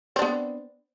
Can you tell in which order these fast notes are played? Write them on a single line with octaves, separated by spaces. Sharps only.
C4 D4 B3